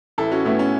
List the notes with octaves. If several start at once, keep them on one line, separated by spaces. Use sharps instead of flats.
A1 E4 A4
C#4 F#4
A2 E3 A3 B3 E4
C#4